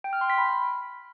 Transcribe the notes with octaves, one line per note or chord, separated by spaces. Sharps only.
G5
F6
C6
B6
B5